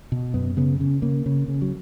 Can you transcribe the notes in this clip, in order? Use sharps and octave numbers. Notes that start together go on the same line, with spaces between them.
B2
F#2 B3
C#3 B3
C#3 C#4
C#3 A#3
C#3
C#3
F#3